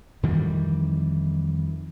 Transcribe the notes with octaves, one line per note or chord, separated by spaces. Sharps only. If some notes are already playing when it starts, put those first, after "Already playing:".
F2 D#3 E3 G3